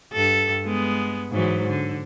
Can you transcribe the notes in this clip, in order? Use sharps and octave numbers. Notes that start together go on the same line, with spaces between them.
G2 A4
G#3 B3
G#2 E3 F#3
D3